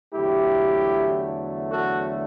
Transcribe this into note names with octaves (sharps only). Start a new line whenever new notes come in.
E2 D3 F#3 A3 E4 G4
F#4 A4